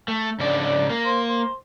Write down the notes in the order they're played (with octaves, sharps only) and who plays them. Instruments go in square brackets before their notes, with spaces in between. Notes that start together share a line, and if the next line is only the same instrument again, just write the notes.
[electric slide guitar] A3
[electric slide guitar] G#2 C#3 D5 [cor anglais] D4
[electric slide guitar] A#3
[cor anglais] C5
C5